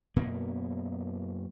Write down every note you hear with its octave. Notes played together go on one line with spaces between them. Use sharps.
F#2 B2 A#3 B3